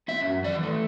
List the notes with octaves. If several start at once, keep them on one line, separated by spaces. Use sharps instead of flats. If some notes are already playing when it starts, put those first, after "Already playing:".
C#4 E5
F#2
E3 D5
A3